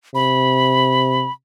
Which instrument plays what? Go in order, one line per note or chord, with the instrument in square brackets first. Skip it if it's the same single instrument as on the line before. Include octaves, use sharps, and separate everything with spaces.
[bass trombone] C3 [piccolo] B5